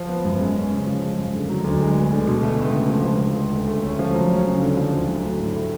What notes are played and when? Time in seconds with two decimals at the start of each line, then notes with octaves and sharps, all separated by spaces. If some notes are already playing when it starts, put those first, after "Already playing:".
Already playing: F3
0.08 B3
0.25 F#2
0.41 G#3
0.56 C#4
0.71 C#3
0.87 F3
1.03 G#3
1.18 F#2
1.34 D3
1.49 F#3
1.64 D2
1.81 G#3
1.96 B3
2.12 D3
2.27 B2
2.43 A3
2.59 C#2
2.74 C#3
2.89 F3
3.05 C#2
3.22 D3
3.37 G#3
3.52 D2
3.68 A3
3.83 C#4
3.99 F3
4.14 F#3
4.30 C#4
4.46 C#3
4.62 D3
4.77 F3
4.93 D2
5.08 F#3
5.23 A3
5.39 A2
5.56 A3